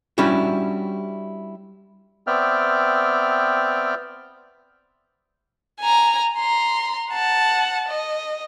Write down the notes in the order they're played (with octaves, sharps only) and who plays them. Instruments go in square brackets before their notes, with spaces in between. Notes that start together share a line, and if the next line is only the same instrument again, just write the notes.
[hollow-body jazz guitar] G3 C#4 D4 E4 F#4
[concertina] B3 C4 D5 E5 G5 F6
[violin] G#5 A#5
A#5 C6
F#5 A5
D#5